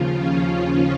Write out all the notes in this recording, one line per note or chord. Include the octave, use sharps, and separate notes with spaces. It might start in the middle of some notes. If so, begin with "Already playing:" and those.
Already playing: D#2 C#3 F3 F4
C#4
C#4